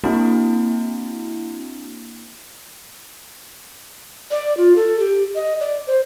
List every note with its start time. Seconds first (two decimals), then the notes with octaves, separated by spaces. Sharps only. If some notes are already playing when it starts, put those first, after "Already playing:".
0.04 A#3 C4 D4 E4 F#4
4.31 D5
4.57 F4
4.76 A4
4.99 G4
5.35 D#5
5.60 D5
5.87 C5